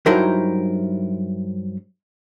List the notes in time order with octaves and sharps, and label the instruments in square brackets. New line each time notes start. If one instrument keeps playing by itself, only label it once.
[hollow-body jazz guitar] G2 F#3 D#4 E4 A#4 C5